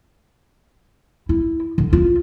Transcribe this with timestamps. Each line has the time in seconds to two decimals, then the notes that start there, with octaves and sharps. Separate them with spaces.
1.29 E4
1.78 D3
1.93 F4